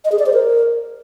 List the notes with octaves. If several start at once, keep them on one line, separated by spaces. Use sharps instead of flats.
D#5
G#4
D5
C5
A#4